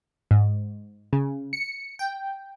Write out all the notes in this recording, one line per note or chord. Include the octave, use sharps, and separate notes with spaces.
G#2
C#3
C#7
G5